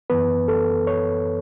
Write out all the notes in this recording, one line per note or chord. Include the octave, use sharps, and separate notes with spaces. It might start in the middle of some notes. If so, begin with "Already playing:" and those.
F#2 E3 B3 B4
A4
C#5